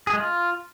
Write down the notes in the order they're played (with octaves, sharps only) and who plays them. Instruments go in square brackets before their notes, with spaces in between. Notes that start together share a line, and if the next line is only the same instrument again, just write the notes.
[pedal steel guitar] G#4
G#3
F4